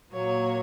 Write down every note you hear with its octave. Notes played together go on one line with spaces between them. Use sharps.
A#2 F#3 A#3 C#5